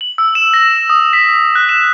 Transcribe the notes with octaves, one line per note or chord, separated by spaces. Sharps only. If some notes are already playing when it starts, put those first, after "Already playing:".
F#7
E6
E7
A#6
D#6
B6
F#6
E7